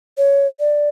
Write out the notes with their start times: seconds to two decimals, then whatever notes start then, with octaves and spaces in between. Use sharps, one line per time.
0.18 C#5
0.60 D5